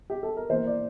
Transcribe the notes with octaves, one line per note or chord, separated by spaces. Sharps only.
G4
A4
A#4
E3 A#3 C5
D5